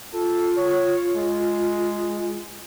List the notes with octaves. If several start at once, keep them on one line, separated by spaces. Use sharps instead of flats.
F4 A4
C#5
G#3